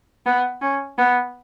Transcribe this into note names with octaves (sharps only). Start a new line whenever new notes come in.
B3
C#4
B3